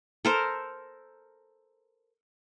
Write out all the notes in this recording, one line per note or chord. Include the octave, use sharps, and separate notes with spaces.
A4 A#4 C5